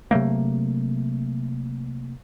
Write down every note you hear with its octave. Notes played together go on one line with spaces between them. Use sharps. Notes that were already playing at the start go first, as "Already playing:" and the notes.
C3 F#3 A3 A#3